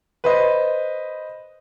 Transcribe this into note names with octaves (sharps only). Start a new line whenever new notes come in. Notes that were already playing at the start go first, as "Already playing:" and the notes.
B4 C5 D#5